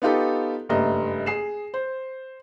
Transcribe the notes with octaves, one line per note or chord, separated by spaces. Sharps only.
B3 D#4 F4 G4 A4
F#1 G2 A3 D#5 E5 A#5
G#4 C7 E7
C5